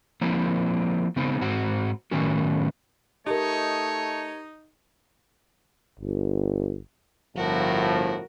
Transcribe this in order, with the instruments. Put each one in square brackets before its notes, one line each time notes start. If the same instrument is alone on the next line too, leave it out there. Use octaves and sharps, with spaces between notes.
[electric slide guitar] F3 A#3 C4 E4
C#3 B3 C4 D#4
G#2 C4 F#4
A2 D#3 F#3 B3 C#4 F#4
[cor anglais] A3 [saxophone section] D#4 [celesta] G4 A#4 [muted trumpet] C#5
[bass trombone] G1
[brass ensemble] G1 A2 F3 [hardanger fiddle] F#4 A#4